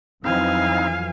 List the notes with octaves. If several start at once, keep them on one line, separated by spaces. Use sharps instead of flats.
F2 E3 F#3 C4 D#4 E4 F5 G#5